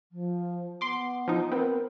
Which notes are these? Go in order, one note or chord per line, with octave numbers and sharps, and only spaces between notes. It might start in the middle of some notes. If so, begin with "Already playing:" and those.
F3
B3 C6 D6
F3 D#4
B3 C4 A#4